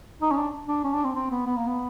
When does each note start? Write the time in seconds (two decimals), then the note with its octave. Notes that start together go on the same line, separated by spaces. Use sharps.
0.22 D#4
0.31 C#4
0.37 D4
0.68 D4
0.84 C#4
0.94 D4
1.04 C4
1.15 C4
1.31 B3
1.46 B3
1.57 A#3
1.67 B3